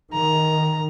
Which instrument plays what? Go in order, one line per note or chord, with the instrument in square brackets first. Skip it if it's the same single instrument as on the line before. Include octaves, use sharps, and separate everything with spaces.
[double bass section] D#3 [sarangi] A#5